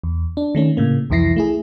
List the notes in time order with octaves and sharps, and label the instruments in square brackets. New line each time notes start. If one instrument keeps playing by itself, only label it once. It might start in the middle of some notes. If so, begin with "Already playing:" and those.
[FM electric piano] E2
D4
D#3 A3 C#4
A2 C#3 A#3
C2 F2 E3 E4 A#6 C7
A3 E4 G#4